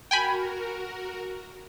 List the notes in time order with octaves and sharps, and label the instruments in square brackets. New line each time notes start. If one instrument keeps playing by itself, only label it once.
[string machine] F#4 A#4 [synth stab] G5 G#5 B5